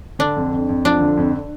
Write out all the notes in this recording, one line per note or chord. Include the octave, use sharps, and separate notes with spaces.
D3 D4
F2
F2
F2
F3 D4
D3
F2